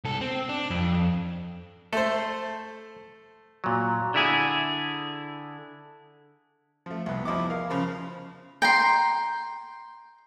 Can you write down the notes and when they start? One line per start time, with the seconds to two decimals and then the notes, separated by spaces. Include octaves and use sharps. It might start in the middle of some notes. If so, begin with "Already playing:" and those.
0.04 C2 A4
0.21 C4
0.49 D4
0.70 F2
1.93 A3 A4 C5
3.64 A#2 F#3
4.14 D3 E4 G#4
6.86 F3 A3
7.06 C2 B3
7.25 E2 F3 E4 D#5 D6
7.50 A#4 F5
7.70 C#3 F3 B5
8.62 G5 A#5 C6